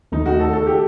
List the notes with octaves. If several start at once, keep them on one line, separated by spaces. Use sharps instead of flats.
D#2 D#3 A3 D#4
F#4
A4
A4
G4